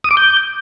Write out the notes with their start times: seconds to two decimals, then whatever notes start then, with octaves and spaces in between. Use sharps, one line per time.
0.04 D#6
0.11 D6
0.17 G6